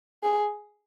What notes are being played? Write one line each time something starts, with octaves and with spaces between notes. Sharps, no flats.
G#4